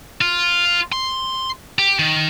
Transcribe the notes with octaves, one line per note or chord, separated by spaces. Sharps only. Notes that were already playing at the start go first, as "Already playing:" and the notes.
F4
C6
G4
D#3